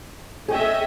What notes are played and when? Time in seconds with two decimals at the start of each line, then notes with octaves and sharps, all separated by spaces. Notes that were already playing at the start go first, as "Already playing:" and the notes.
0.48 C#4 G#4 D#5 E5 G5